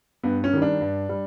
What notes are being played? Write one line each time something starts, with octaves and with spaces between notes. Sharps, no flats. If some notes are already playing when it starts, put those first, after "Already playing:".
G2 B3
C#4
D#3 G3
D4
G2
G3